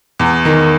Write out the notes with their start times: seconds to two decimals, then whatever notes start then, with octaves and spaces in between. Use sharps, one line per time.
0.19 E2
0.45 D#3